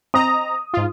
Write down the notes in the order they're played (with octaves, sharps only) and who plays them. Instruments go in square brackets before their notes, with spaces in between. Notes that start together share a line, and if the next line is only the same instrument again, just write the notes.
[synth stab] C4 D#5 A#5 [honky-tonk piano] D#6
[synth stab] G#2 F4